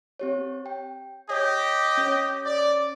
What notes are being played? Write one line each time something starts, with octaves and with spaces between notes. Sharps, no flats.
C4 G4 C#5
G5
G4 C#5 D#5
C#4 C#5
D5